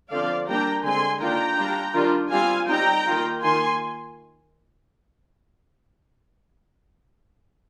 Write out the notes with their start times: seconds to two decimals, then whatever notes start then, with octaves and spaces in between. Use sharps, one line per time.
0.10 D3 F3 C4 D5 F5
0.47 G3 A#3 D4 G5 A#5
0.84 D3 G#3 C4 G#5 C6
1.20 D#3 A#3 D4 F4 G5 A#5
1.57 G3 D4 F4
1.94 D#3 G3 D4 F4
2.31 G3 C4 F4 F5 G#5
2.68 G3 C4 D#4 G5 A#5
3.06 D#3 A#3 F4
3.41 D#3 A#3 F4 G#5 C6